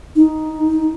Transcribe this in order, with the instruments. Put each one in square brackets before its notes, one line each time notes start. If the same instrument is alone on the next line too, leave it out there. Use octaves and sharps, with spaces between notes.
[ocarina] D#4